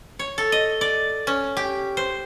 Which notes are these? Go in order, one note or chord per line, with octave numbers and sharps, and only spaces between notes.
C#5
A4
D#5
D5
C#4
G4
C5